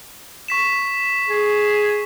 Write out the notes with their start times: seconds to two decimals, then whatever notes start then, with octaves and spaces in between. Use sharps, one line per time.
0.48 C#6 B6 E7
1.29 G#4